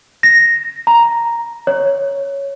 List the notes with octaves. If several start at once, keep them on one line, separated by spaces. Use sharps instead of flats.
A#6
A#5
C#5